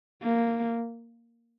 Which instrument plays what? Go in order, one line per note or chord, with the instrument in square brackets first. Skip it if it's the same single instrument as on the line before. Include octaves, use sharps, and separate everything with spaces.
[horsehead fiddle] A#3